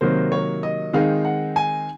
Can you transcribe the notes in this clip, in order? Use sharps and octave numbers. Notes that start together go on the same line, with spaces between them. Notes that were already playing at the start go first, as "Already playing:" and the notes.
C3 D#3 F#3 A#3 C5
C#5
D#5
D#3 G#3 C4 D#4 F5
F#5
G#5